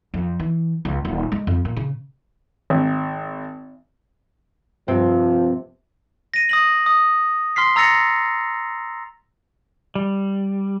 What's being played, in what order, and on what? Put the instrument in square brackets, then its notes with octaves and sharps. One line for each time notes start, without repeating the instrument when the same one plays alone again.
[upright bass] F2
E3
C#2
D#1
G#3
F2
A#2
C#3
[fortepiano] G#1
[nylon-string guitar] G2 C3 C4 [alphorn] F3
[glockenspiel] A#6 D#7
D#6 A#6 F#7
D#6
C6 F6 B6 C7
A#5 E6 A6 A#6 C#7 F7
[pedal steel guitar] G3